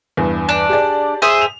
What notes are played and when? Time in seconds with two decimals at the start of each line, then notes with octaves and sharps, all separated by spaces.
0.17 E2 G2
0.49 D4
0.69 G4 G#4 D5
1.22 G#4 C5 E5
1.41 F7